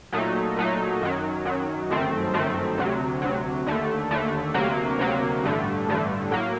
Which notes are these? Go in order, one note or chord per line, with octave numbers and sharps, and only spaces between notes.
A#2 F#3 A3 D#4
A#2 F#3 A3 D#4
F#2 D#3 F#3
F#2 D#3 F#3
G1 F#2 D#3 A3 C4
G1 F#2 D#3 A3 C4
D2 C3 F#3
D2 C3 F#3
D#2 D3 A3
D#2 D3 A3
D2 C3 F#3 A#3
D2 C3 F#3 A#3
A1 G2 D3 A3
A1 G2 D3 A3
A2 F#3 A#3